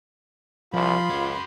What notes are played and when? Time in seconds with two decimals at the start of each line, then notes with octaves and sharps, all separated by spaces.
0.73 C2 F3 F4 B5 C6
1.09 C#2 F#4 G#5